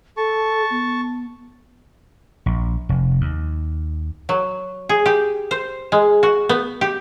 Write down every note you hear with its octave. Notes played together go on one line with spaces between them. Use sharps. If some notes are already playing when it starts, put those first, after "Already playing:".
A4 A5 C#6
B3
A#1
F1
D#2
F#3
G#4
G4
C5
G#3
F#4
B3
G4